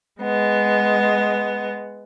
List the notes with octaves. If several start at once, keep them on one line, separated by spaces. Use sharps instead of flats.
G#3 B3